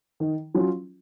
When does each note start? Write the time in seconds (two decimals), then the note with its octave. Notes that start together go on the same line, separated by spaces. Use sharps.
0.20 D#3
0.54 F#3 C#4 F4